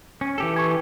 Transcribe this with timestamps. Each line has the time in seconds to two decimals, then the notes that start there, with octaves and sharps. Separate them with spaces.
0.21 C#4
0.38 E3 G4 A4
0.56 G#5 C#6